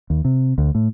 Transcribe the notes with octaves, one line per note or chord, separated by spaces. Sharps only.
D#2
C3
D2
A2